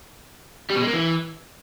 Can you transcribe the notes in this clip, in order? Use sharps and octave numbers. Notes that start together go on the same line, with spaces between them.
G3
B2
G#3
A#3
E3